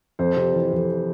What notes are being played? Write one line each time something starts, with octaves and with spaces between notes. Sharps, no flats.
F2 C5
C3
E3
F2